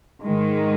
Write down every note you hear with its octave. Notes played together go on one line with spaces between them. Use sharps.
G#2 D#3 G#3